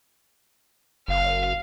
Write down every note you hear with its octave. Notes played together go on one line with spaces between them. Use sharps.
F#1 F5